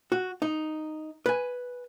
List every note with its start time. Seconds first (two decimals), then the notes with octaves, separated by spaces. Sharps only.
0.12 F#4
0.42 D#4
1.26 B4 G#5